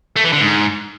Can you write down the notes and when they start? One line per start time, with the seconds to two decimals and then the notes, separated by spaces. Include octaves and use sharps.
0.16 A3
0.24 E3
0.33 D3
0.41 G#2